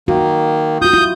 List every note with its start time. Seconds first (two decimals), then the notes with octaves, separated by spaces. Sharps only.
0.08 D#3 A#3 F#4
0.82 F4 F#4 D#6 G6
0.93 E4 F4